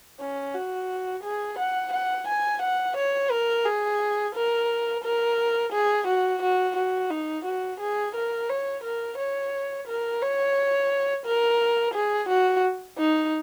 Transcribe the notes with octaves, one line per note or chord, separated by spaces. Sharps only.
C#4
F#4
G#4
F#5
F#5
G#5
F#5
C#5
A#4
G#4
A#4
A#4
G#4
F#4
F#4
F#4
D#4
F#4
G#4
A#4
C#5
A#4
C#5
A#4
C#5
A#4
G#4
F#4
D#4